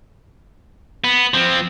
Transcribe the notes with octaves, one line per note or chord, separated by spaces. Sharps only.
B3
F3 C4